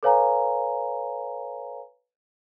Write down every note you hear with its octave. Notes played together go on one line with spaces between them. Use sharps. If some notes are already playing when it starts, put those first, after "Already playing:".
A4 B4 C#5 F5 G#5 A#5